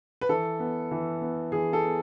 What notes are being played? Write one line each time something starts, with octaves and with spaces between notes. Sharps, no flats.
B4
E3 A4
B3
E3
B3
E3 G#4
A4
B3